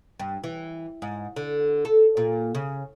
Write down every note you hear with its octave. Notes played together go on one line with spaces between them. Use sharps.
G2
E3
G#2
D3
A4
A#2
C#3